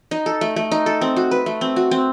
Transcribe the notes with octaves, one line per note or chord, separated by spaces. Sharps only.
D#4
A4
A3
A3
D#4
A4
C4
F#4
B4
A3
C4
F#4
C4